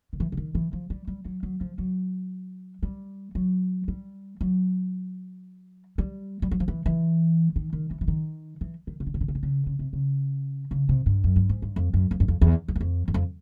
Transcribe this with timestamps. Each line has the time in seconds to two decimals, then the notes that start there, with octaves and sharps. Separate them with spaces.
0.13 D#3
0.20 E3
0.32 D3
0.37 D#3
0.55 E3
0.73 F3
0.90 G3
1.07 G3
1.25 F#3
1.43 F#3
1.61 F3
1.78 F#3
2.82 G3
3.35 F#3
3.88 G3
4.41 F#3
5.98 G3
6.42 G3
6.51 F#3
6.60 F3
6.68 E3
6.86 E3
7.56 D#3
7.73 D#3
7.91 E3
8.01 E3
8.08 D#3
8.61 E3
8.87 D#3
9.00 C#3
9.07 D3
9.14 C#3
9.21 D3
9.28 C#3
9.35 D3
9.43 C#3
9.66 C#3
9.79 C3
9.93 C#3
10.71 C#3
10.89 C3
11.06 G2
11.24 F#2
11.36 G2
11.49 G#2
11.62 G2
11.76 F2
11.94 F#2
12.11 F2
12.20 F#2
12.28 F2
12.41 E2
12.68 F2
12.76 F#2
12.81 F2
13.08 E2
13.14 F2